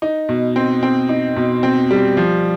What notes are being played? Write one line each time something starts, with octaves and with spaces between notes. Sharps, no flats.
D#4
B2
C4
C4
D#4
B2
C4
G3
F3